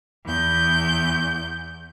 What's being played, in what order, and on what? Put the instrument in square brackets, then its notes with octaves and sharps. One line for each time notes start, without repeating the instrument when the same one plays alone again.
[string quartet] E2 G6